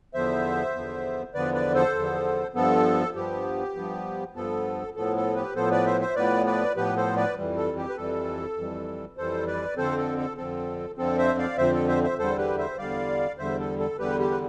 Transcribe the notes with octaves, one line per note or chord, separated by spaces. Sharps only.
E2 D3 F3 B3 C5 E5
E2 D3 F3 B3
E2 D3 F3 B3 B4 D5
B4 D5
A4 C5
E2 D3 F3 B3
G2 F3 B3 A4
G2 F3 B3 G4
G2 F3 B3
G2 F3 B3 A4
A2 F3 B3 A4
A4
G4 B4
A2 F3 B3 A4 C5
B4 D5
C5 E5
C5 E5
A2 F3 B3 B4 D5
B4 D5
A2 F3 B3 G4 B4
A4 C5
B4 D5
F2 E3 G3
A4
G4
B4
F2 E3 G3 A4
F2 E3 G3
F2 E3 G3 A4 C5
B4 D5
F2 D3 F3 C4 A4 C5
A4
A4
F2 D3 F3 C4 A4
F2 D3 F3 C4 A4
C5 E5
D5 F5
F2 D3 F3 C4 C5 E5
A4
C5 E5
C5 E5
E2 D3 G3 A4 C5
G4 B4
C5 E5
E2 D3 G3 D5 F5
E2 D3 G3 C5 E5
A4
A4
E2 D3 G3 G4 B4
G4
B4